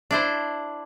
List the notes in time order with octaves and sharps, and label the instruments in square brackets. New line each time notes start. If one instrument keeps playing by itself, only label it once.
[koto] D4 E4 C5